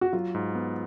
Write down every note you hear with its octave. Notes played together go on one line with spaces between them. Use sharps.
F#4
F#3 F4
G#2
B3